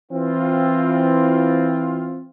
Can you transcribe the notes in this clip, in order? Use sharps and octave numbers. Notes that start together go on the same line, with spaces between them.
E3 C4 F4